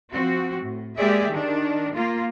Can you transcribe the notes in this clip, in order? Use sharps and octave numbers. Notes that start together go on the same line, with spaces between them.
F3 C4 F#4
A2
G#3 A#3 G4 G#4 D5 E5
D#3 D4
A#3 F4